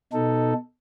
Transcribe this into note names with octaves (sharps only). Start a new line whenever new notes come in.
B2 D#4 A4